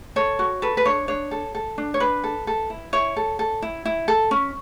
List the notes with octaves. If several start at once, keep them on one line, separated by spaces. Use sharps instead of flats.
A4 C#5
F#4
A4 B4
B4
D4 C#5
D4 C#5
A4
A4
D4
C#5
D4 B4
A4
A4
E4
E4 C#5
A4
A4
E4
E4
A4
C#4